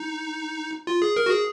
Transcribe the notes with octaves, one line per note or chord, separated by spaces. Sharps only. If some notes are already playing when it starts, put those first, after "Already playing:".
Already playing: D#4
F4
G#4
A#4
F#4
G#4